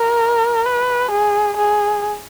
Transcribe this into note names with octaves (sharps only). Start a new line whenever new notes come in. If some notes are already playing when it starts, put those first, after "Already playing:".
Already playing: A#4
B4
G#4
G#4